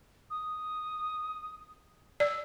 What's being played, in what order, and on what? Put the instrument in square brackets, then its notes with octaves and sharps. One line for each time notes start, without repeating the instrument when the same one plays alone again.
[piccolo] D#6
[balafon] D5 [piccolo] E6